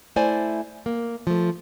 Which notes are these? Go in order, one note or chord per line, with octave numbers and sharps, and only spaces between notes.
A3 E4 C5 D5 G#5
A#3
F3 A3